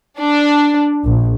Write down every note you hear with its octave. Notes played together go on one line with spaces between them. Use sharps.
D4
A#1